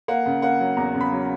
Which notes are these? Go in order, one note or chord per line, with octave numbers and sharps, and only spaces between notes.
A#3 F#5
C#3
A#3 F#5
F#3
E2 A#5
C#3
B5
F#3